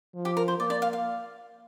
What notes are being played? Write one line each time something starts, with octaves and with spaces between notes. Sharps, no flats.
F3
G4
A#4
C5
A#3 D5
D5
F5
F5